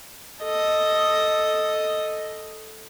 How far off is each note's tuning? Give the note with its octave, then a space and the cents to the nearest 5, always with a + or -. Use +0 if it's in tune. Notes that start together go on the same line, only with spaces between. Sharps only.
A4 +0 D#5 +0